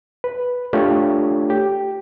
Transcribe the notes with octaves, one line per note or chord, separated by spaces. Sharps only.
B4
A3 D4 F4 G4 A4 C#5
G4